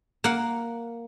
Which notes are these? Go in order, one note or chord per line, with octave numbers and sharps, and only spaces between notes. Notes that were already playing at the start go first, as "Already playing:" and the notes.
A#3 F#5